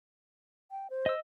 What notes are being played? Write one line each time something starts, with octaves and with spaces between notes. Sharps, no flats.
G5
C5
D#5 E6